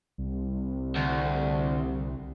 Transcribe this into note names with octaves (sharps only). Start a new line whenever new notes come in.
C2
D2